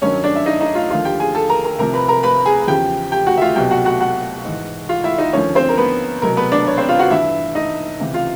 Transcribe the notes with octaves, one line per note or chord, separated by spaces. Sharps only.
G2 D#3 F#3 C#4 C#5
D4 D5
E5
D#4 D#5
D#4 D#5
F4 F5
D#2 D3 F3 F4 F5
G4 G5
G#4 G#5
A4 A5
A#4 A#5
A#4 A#5
C2 C3 F3 A#4 A#5
B4 B5
A#4 A#5
B4 B5
G#4 G#5
E2 C#3 F3 G4 G5
G4 G5
F#4 F#5
E5
F4 F5
C2 B2 F#3 G4 G5
F#4 F#5
F#4 F#5
F#4 F#5
G#2 E3
F4 F5
E4 E5
D#4 D#5
D#2 D3 F3 C#4 C#5
C4 C5
A#4
B3 B4
C2 B2 F#3 A#4
B3 B4
D4 D5
C#5
C4 C5
F4 F5
F#4 F#5
G2 E3 E4 E5
D#4 D#5
C#2 C3 E3
F4 F5